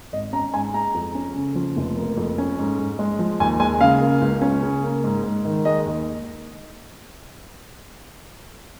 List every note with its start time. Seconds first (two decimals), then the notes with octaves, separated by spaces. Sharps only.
0.13 G#1 D#5
0.33 C#4 A#5
0.54 G#2 G#5
0.74 G#3 A#5
0.94 F2
1.15 C#4
1.36 C#3
1.55 F3
1.77 F1
1.97 A#3
2.17 F2
2.38 C#4
2.59 G#2
2.79 G#2
2.99 G#3
3.19 F3
3.40 D#2 G#5
3.60 G#3 G#5
3.81 C#3 F5
4.01 A#3
4.21 C#2
4.42 C#4
4.63 C#3
4.84 A#3
5.04 G#2
5.23 G#2
5.45 D#3
5.65 G#3 D#5
5.85 D#2